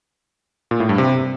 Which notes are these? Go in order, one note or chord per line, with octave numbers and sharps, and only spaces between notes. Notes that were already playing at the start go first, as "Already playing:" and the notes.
A#2
A2
G2
C3